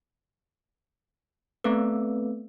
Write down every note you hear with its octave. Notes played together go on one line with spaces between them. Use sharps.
A3 B3 C4 A4 B4